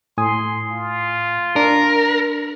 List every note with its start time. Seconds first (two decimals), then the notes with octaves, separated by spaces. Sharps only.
0.18 A2 G#5 C6 D#6
0.71 F4
1.56 D4 A#4